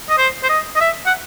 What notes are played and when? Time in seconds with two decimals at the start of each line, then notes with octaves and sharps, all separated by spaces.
0.09 D#5
0.18 C5
0.43 C5
0.49 D#5
0.76 D#5
0.81 E5
1.06 F#5